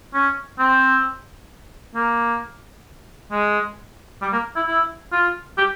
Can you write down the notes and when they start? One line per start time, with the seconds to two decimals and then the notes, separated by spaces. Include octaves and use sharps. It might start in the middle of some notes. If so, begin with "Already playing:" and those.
0.14 C#4
0.59 C4
1.95 A#3
3.32 G#3
4.22 G3
4.33 A#3
4.56 E4
4.67 E4
5.12 F4
5.58 G4